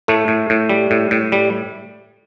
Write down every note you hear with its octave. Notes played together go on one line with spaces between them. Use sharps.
A2 A3
A2
A2
G3
A2
A2
G3